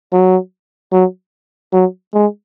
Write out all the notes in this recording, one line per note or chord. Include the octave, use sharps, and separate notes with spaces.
F#3
F#3
F#3
G#3